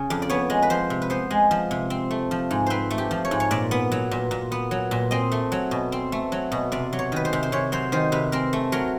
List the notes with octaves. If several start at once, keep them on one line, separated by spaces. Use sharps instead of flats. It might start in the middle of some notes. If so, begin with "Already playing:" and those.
Already playing: C#3
F2
D5
B3 C#5
G#3
B4
F3 C5
C3
B4
B3 C5
G#3
F3
C3
C4
A3
F3
G#2
C4 B4 C5
A3
G4
F3
C#5
G#2
C#5
A#2 D5
B3
F#3
A#2
A#2
B3
F#3
A#2
C4 D#5
A3
F#3
B2
C4
A3
F#3
B2
C3 D5
F#3
C#5
D#3 B4
C5
C3
C5
C3 C#5
F#3 C5
D#3 C5
C3 B4
C4 A#4
A3
F#3 A#4